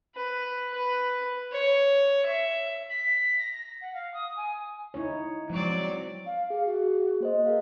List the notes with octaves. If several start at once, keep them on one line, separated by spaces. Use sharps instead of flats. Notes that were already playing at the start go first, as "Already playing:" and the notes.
B4
B4
C#5
E5
B6
A#6
A#6
F#5
F5
D#6
G#5
D#4 E4 C#5
F3 F#3 G#3 C4 D5
F5
G#4 F5
F#4
A#3 C5 D#5
G#4 A#4 F5